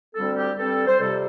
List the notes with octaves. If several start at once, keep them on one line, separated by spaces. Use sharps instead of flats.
D2 D3 G3 C4 A4
G4
G2 G3 C4 A4
C5
F2 C3 G3 A4